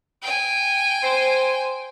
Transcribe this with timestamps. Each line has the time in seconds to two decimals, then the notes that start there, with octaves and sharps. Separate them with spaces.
0.22 G5 G#5
1.03 C5